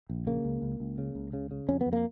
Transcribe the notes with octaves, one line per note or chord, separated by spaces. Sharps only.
A#1
C#3 A#3
C#2
C#2
C#2
C#3
C#2
C#3
C#3
F2 C#4
B3
F2
A#3